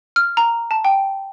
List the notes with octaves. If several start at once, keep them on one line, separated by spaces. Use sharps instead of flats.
F6
A#5
A5
G5